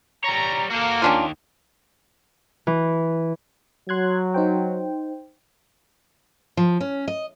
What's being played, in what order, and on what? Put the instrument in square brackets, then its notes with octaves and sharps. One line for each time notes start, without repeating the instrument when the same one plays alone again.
[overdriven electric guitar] G3 C#5 [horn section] A#5
[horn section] A#3 [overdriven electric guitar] F#4 A4
[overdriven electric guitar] D#2 D#3 [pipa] C#4 D4 F4
[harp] E3
[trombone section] F#3 [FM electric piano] C6 F#6 G#6
[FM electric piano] D#4 C5 G5
[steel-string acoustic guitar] F3
C#4
D#5